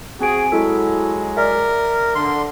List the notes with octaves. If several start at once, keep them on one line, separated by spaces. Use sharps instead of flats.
C4 F#4 G#4 G#5 D7
F#3 G#3 E4 F#4 A4
A#4 D5 E5
D3 C6